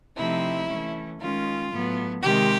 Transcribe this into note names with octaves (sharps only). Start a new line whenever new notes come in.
C3 F3 A3 C4 D#4 E4
E3 A3 C#4
D#3 G#3 C#4 F4
A2 F#3 B3
C3 D#3 G#3 G4